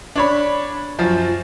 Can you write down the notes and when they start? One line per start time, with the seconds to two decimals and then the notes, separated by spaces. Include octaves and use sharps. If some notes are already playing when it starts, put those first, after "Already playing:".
0.16 D4 C#5 B5
0.99 F#2 F3